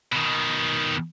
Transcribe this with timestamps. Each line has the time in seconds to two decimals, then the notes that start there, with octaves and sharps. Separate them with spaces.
0.12 B2 D#3